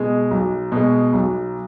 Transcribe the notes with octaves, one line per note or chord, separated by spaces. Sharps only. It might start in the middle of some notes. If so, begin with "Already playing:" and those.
Already playing: B2 G#3
B1
B2 G#3
B1